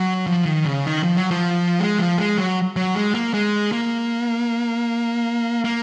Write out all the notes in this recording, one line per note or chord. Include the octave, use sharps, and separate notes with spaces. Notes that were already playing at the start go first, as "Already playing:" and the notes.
Already playing: F#3
F3
D#3
C#3
D#3
F3
F#3
F3
G#3
F3
G#3
F#3
F#3
G#3
A#3
G#3
A#3
A#3